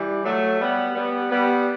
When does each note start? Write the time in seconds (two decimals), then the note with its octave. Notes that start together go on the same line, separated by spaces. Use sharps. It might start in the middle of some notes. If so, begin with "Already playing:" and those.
Already playing: E3 G3
0.24 F#3 A3
0.60 G3 B3
0.95 G3 B3
1.30 G3 B3